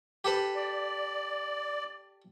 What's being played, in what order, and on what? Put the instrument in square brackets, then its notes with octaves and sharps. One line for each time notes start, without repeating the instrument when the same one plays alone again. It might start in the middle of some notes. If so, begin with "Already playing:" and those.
[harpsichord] G4 A4 B4
[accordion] D5